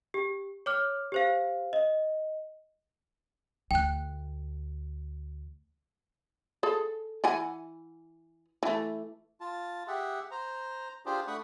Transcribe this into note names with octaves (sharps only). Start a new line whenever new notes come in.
G4
C#5 D6 F6
G4 C5 F5
D#5
D2 G5 F#6
G#4 A4
E3 F#5 G#5
E3 A3
F4 A5
G4 G#4 E5 F#5
C5 A#5
D4 F4 G4 G#4 C5
A3 D4 F#5 B5 C#6 D#6